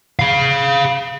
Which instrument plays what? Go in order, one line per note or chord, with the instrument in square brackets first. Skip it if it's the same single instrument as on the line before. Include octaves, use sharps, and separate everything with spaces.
[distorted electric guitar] G#4 F5